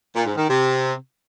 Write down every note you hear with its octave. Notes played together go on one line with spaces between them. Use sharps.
A#2
G#2
D#3
C3